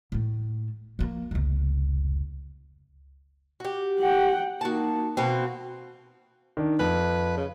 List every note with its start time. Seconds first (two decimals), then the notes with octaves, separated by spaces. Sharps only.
0.12 A2 A3
0.99 F3 A#3
1.31 F1 C#2
3.60 F#4 G4
3.99 F#5 G5
4.61 A#3 D#4 F#4 A5
5.17 B2 A#3 C4 F#4
6.57 D#3 D4
6.79 F2 B4
7.37 C#3